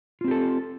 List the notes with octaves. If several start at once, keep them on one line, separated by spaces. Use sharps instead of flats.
C4 F4 G4 A4